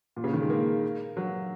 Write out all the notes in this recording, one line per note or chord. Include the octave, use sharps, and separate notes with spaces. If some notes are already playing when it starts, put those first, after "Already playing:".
A#2
C#3
D#3
G#3
A#3
F#3